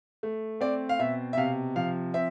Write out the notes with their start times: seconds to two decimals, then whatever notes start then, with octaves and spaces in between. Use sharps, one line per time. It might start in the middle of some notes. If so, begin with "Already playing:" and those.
0.23 A3
0.61 C4 D5
0.89 F5
0.99 B2 E5
1.33 E5
1.37 C3 F5
1.76 F3 F5
2.14 C4 E5